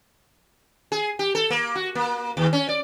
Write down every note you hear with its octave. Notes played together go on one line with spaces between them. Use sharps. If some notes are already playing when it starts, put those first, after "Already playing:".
G#4
G4
A4
A#3
F#4
A#3
D#2
C#4
D5